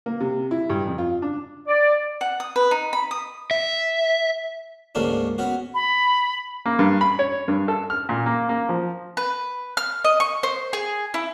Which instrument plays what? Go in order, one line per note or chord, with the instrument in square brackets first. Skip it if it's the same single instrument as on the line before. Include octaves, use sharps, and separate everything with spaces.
[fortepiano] A#3
C3
E4
G2
F2
F4
D4
[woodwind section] D5
[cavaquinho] F#5
D#6
B4
D#4
B5
D#6
[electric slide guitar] E5
[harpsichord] D2 G#2 A#3 C#4 D4
B3 C#4 F#4
[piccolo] B5
[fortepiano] A#3
G2
B5
C#5
G2
A4
F6
A#2
A#3
A#3
F3
[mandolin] B4
F6
D#5
C#6
C5
G#4
E4